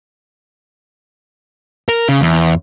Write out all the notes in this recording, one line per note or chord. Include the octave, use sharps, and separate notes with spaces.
A#4
C#3
E2